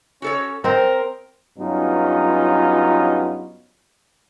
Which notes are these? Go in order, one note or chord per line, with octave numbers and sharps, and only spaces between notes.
C#4 F#4 A4 C#5
C4 A#4 C5 D#5
G2 F#3 B3 C#4 D#4 F4